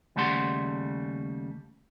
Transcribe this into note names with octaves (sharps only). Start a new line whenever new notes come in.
D#2 C#3 G3 A3 F#5 C6